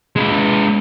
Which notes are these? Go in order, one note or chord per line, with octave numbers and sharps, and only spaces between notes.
G#3 B4